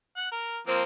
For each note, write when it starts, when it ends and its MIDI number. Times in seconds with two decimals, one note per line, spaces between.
0.16 0.27 78
0.31 0.59 70
0.67 0.83 53
0.67 0.83 58
0.67 0.83 60
0.67 0.83 72